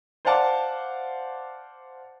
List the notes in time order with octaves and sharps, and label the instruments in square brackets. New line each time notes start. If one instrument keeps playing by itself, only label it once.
[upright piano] C5 D5 F5 F#5 A5 D6